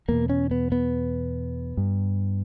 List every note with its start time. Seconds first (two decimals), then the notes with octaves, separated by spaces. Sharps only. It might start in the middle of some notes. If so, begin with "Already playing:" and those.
0.08 E2 B2 A#3
0.29 C#4
0.51 B3
0.72 B3
1.77 G2